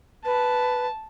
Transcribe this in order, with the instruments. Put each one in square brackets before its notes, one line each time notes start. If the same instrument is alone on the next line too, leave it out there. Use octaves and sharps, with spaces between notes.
[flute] B4 [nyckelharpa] A5